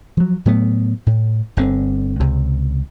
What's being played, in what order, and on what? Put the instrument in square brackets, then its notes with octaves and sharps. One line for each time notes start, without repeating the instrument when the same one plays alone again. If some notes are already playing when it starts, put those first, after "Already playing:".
[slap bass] F3 F#3
A2 F#3 A3 B3
A2
G1 D3 C4
C#2 C3